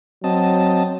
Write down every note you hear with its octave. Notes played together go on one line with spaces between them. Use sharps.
F#3 C4 D#5 A5